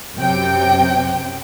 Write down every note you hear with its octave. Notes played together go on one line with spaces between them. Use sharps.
F#2 C3 G5